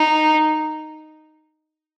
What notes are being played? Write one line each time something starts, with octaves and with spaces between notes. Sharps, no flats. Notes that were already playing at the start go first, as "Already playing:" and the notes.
Already playing: D#4